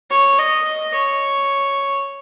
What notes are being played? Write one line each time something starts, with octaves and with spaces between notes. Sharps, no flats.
C#5
D#5
C#5